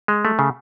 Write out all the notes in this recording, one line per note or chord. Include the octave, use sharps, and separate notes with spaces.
G#3
A3
C#3